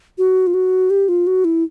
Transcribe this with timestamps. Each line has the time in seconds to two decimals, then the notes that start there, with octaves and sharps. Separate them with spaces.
0.18 F#4
0.47 F4
0.54 F#4
0.90 G4
1.09 F4
1.27 F#4
1.45 E4